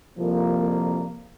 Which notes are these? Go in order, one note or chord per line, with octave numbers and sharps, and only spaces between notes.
C2 F2 A#2 F3 A#3